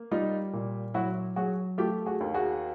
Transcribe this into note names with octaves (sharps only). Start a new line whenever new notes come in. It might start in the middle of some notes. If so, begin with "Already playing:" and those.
Already playing: A#3
G3 D#4 F4
A#2
F#3 E4 F#4
F#3 F#4 G#4
A3 F4 G4
F#4 G#4
D#2
F#4 G#4